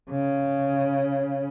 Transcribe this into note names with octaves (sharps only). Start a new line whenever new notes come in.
C#3